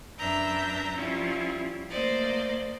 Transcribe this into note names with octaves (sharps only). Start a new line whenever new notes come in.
F#2 D4 B4 E5 A#5 G6
F3 G3 C#4 E4 F4
A3 A#3 C5 D5 D#5